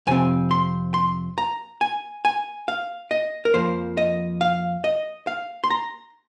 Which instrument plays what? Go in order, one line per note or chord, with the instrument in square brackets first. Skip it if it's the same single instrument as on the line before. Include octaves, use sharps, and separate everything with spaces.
[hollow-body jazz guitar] F2 C3 C4 G#5
C6
C6
A#5
G#5
G#5
F5
D#5
A#4
F2 F3 A#3 C5
D#5
F5
D#5
F5
C6
A#5